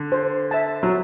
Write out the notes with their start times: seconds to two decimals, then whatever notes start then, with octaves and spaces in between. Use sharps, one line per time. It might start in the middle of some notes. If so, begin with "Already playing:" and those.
Already playing: D3
0.12 C5
0.51 E5 A5
0.83 F#3